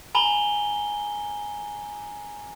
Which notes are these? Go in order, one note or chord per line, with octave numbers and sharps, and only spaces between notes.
G#5 A#5 B5 G7